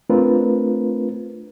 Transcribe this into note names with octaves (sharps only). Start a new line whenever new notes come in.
A3 C4 D4 F4 A#4 B4